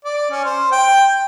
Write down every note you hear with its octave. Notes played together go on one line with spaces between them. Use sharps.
D5
C#4
C5
G5